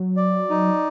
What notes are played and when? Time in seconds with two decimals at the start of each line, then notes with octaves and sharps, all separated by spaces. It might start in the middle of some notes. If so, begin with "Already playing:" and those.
Already playing: F#3
0.17 D5
0.50 D#4